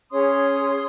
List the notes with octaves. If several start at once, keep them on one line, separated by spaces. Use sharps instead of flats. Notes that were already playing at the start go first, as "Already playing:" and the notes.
C#4 G#4 C#5 C6 D#6